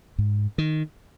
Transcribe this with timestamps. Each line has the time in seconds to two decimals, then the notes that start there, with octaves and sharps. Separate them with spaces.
0.18 G#2
0.58 D#3